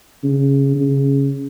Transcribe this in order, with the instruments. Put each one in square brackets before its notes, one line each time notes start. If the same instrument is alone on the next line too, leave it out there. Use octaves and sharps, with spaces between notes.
[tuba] C#3
C#3